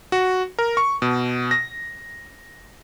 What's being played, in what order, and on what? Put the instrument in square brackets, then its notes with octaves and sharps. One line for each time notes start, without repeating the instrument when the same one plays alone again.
[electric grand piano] F#4
A#4
C#6
B2
A#6